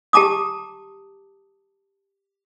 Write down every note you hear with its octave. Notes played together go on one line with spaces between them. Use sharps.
G4 A5 A#5 D6 D#6